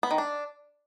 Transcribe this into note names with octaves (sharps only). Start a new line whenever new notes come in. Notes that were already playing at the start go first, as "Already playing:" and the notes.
B3
D#3
D4